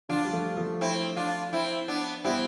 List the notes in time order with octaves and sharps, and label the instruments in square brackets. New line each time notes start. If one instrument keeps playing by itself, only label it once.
[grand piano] D3 F3 [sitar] D4 F4
[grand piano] G3
F3 A3
F3 A3
[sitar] C4 E4
D4 F4
C4 E4
B3 D4
[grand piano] G3 B3 [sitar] C4 E4